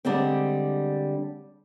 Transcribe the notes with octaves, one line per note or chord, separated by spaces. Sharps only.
D3 G3 G#3 C4